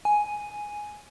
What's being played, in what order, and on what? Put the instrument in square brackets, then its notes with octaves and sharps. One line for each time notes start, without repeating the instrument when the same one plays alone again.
[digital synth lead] G#5